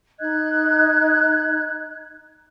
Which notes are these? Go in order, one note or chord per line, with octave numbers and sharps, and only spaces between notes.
D#4 D#5 F#6 G#6